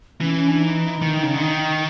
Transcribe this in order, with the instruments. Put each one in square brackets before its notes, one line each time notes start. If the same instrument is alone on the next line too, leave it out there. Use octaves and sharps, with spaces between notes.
[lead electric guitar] E3 [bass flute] C#4
[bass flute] C#4
D4
D#4
[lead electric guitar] D#3
C#3
D3
D#3